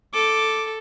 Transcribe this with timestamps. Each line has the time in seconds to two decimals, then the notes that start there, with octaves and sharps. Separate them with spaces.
0.14 A4 D6